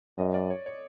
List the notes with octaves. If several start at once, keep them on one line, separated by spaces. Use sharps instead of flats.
F#2 D#5
D5
C#5
C#5